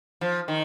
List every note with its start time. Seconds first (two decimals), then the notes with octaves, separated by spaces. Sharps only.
0.21 F3
0.48 D#3